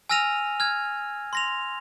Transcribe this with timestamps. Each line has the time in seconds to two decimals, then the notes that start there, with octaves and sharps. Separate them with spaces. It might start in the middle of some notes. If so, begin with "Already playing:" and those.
0.10 G#5 E6 F6 A#6 D#7 F7
0.60 F6 G#6
1.33 C6 A#6 F7